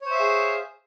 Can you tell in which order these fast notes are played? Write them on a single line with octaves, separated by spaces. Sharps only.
C#5 C5 E5 F5 G#4